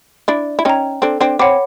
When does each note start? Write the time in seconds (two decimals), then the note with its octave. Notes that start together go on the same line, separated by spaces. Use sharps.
0.28 D4 E4 D5
0.59 E4
0.65 C#4 D#4 G5 A#5
1.02 C4 D4 A4
1.21 C4 D4
1.39 C4 C#5 F#5 B5 D6